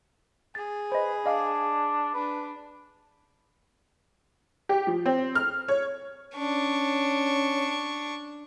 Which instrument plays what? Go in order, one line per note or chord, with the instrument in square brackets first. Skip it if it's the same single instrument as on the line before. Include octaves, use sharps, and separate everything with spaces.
[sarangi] G#4 [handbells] A6
[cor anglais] B4 [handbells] C5 D#5
[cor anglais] D4 [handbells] D#5 F5
[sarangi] D4 [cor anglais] B4
[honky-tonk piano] G4
F3
C4
F6
C#5
[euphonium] C#4 [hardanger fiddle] D4 C#6